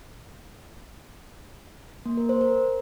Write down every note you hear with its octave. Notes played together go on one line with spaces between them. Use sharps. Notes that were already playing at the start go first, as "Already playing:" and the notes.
A#3
A#4
C5
A#4